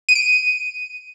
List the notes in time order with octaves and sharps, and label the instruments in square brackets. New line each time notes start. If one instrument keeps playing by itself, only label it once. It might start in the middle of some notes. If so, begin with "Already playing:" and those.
[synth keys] D#7
D7
D#7